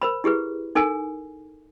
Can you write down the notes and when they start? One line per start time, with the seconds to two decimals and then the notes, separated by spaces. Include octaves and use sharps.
0.02 A#4 C5 B5
0.24 E4 G4 G#4 B4
0.75 D#4 A4 A#4 G#5